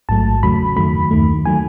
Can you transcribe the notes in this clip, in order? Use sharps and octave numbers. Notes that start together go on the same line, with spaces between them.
A1 G#2 F#3 A3 A5
E2 C#3 F#3 A3 B5
F#2 D#3 F#3 A3 B5
D#2 D#3 A3
D#3 F#3 A3 G#5